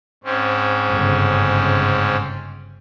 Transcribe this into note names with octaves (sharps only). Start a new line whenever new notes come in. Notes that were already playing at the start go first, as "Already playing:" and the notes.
G#2 C4 C#4
G1 C#3